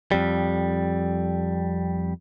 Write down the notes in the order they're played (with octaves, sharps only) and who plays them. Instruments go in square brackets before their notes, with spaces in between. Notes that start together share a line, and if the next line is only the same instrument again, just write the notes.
[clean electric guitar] F2 G3